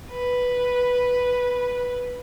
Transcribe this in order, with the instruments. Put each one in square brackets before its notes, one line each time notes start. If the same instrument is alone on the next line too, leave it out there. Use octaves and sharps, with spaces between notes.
[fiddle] B4